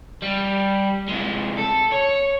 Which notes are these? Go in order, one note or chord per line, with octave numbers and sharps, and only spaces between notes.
G3
C3 G#3
A4
C#5